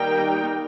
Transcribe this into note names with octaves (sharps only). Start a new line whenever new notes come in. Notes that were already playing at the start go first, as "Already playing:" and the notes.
Already playing: D#3 G3 A#3 D#4 G5